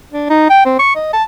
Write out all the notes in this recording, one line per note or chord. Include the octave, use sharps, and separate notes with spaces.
D4
D#4
G5
C4
C#6
D#5
A5